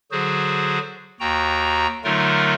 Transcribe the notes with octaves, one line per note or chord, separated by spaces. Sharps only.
D3 F#3 F#4 G#4 C5
D#2 F#4 G5 A#5
D3 F#3 A3 D#4 F4 A#4